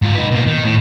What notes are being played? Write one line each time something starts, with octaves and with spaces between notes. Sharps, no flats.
G#2 F4
D#4 B4
B2 A#3
D#3
A2